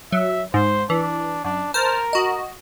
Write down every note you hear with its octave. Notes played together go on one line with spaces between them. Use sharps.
F#3 E5
G#2 C5
E3 D4
F#2 D4
A#4 C5 A5 F6
F#4 D#5